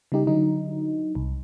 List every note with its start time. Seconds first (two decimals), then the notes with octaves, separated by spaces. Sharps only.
0.12 C#3 G3 D#4 G4
0.27 D3 F#3 D#4
1.15 C2